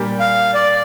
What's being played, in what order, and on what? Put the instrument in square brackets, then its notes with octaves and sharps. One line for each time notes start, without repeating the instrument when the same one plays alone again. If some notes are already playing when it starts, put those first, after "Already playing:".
Already playing: [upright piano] A#2 G3 D4 G4 A#4
[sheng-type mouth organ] F5
D5